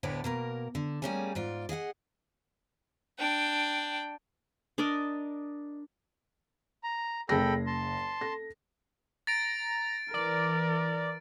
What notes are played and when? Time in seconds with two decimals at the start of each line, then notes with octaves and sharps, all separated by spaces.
0.03 D2 A2 D3 B3 C#5 D5
0.24 B2 A#3 A#4
0.75 D3
1.02 A2 G3 A#3 C#4 G#4 G#5
1.35 G#2 F4 D5
1.69 G#4 D#5 F5 F#5
3.19 D4 G5
4.78 D4 A#4 D5 D#5
6.84 A#5
7.29 F#1 G#4 A4 G5 B5 A#6
7.67 A5 C6
8.21 A4 A#6
9.27 A#5 A6 D7
10.14 E3 A#4 D5